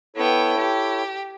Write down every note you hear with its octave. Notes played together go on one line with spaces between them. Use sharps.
B3 E4 A4 C#5 G5
G4